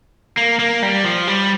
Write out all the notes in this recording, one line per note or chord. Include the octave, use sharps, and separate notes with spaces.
A#3
A#3
G3
F3
G3